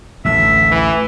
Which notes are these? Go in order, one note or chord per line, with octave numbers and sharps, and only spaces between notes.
A1 D2 A3 E5
E3